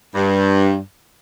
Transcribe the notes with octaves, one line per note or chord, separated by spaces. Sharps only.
G2